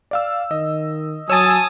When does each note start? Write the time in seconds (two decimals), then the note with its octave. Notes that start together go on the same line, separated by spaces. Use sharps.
0.11 D5 F5 E6
0.51 D#3 D#5
1.30 F#3 C#5 G#5 A5 D#6 E6 A6